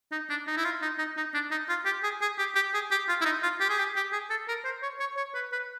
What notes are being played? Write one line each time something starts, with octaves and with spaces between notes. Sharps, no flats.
D#4
D4
D#4
E4
F4
D#4
D#4
D#4
D4
D#4
F4
G4
G#4
G#4
G4
G4
G#4
G4
F4
E4
D#4
F4
G4
G#4
G4
G4
G#4
A4
A#4
C5
C#5
C#5
C#5
B4
B4